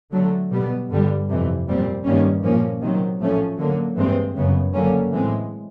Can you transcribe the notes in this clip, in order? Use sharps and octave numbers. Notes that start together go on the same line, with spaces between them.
D3 F#3 A3
B2 G3 B3
G2 D3 G3
F2 C3 E3
A#2 G3 C4
G2 D#3 G3 A#3 C#4
A#2 F3 A#3 C#4
C3 D#3 F#3
A2 F3 A3 C#4
D3 F#3 A#3
G2 E3 G#3 C4
F#2 C#3 F#3 B3
D3 F#3 A#3 C#4
A2 E3 G#3 C4